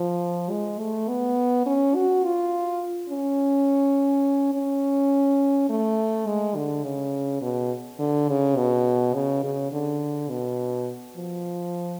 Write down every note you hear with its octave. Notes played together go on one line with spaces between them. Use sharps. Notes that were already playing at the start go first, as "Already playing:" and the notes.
Already playing: F3
G#3
A3
B3
C#4
F#4
F4
C#4
C#4
A3
G#3
D3
C#3
B2
D3
C#3
B2
C#3
C#3
D3
B2
F3